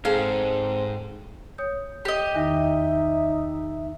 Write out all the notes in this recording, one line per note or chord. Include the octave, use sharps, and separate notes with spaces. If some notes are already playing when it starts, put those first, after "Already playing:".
G#2 C4 G#4 A4 F5
C#5 D#6 G6
G4 D#5
E2 D#3 D#4 E5 A#6